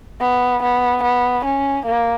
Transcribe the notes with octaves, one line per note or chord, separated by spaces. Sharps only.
B3
B3
B3
C#4
A#3